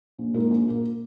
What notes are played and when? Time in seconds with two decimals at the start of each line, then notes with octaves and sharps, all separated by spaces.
0.18 A#1
0.34 A#2 G#3 D#4 A#4
0.50 A#1
0.66 A#2 A#3